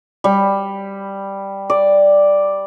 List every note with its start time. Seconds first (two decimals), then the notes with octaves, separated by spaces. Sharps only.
0.24 G3
1.70 D5